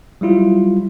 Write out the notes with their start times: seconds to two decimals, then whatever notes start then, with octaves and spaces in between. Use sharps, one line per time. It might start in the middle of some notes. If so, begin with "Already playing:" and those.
0.21 F#3 G3 E4 F4